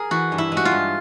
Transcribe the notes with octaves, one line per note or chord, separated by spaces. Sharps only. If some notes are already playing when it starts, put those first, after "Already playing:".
Already playing: G#4 A#4
E3 F#4
G2
E4
G#3
F#4
F4
G2